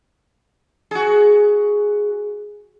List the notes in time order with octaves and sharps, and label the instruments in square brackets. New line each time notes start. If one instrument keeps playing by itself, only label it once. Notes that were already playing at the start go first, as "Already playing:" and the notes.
[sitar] F#4 G#4